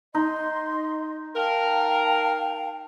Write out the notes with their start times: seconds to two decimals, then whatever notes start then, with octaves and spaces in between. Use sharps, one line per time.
0.15 D#4 D#5 C6
1.36 A#4 F5 G5 A5